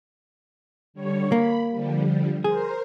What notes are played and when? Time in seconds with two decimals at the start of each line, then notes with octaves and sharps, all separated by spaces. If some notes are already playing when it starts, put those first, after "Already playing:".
0.94 D3 G3 C#5
1.32 A#3 B5
1.71 D3 F3 G3
2.44 G#4 A#4 C5